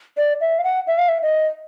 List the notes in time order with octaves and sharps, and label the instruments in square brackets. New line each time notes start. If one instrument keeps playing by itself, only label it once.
[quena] D5
E5
F5
F#5
E5
F5
E5
D#5